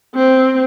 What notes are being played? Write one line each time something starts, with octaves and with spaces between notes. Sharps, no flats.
C4